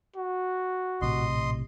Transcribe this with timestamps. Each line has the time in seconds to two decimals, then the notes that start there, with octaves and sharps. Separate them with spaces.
0.16 F#4
1.02 A#1 A2 C3 D#5 C6